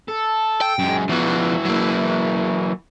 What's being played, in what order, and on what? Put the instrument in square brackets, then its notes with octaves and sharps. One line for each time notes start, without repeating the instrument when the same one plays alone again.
[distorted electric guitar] A4
[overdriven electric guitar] G5
[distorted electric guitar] F#2 G#3
[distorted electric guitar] E3 F#4 [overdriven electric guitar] F3 B3
[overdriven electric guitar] F#3 A#3